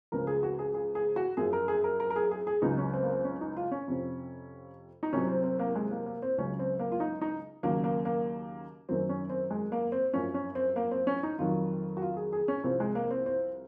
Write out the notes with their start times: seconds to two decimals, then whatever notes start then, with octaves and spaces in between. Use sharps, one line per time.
0.12 C#2 C#3 F3 A#4
0.27 G#4
0.43 F#4
0.59 G#4
0.74 G#4
0.95 G#4
1.16 F#4
1.37 F#2 F3 G#4
1.53 A#4
1.68 G#4
1.84 A#4
2.00 A#4
2.10 A#4
2.16 G#4
2.31 G#4
2.47 G#4
2.62 C#2 C#3 F#3 D#4
2.78 C#4
2.93 C4
3.03 A#3
3.10 C4
3.25 C#4
3.41 D#4
3.57 F4
3.71 C#4
3.88 F2 C3 F3
5.03 D#4
5.13 C2 C3 F#3 C#4
5.28 C4
5.44 C4
5.59 A#3
5.75 G#3
5.91 A#3
6.06 A#3
6.22 C4
6.38 C#2 C#3 F#3 C#4
6.59 C4
6.79 A#3
6.92 F4
7.00 D#4
7.21 D#4
7.63 D#2 C#3 F#3 A#3
7.84 A#3
8.05 A#3
8.89 F#2 D#3 F#3 C4
9.09 C#4
9.30 C4
9.50 G#3
9.72 A#3
9.92 C4
10.13 F#2 F3 C#4
10.34 C#4
10.55 C4
10.76 A#3
10.91 C4
11.07 C#4
11.23 D#4
11.38 F2 D#3 F#3 F4
11.97 F#4
12.02 F4
12.16 G#4
12.33 G#4
12.48 C#4
12.64 C2 C3 F3 C4
12.80 G#3
12.95 A#3
13.11 C4
13.26 C4